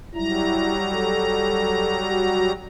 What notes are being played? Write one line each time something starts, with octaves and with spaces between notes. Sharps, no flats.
F#3 G3 E4 A#5
A4
F#4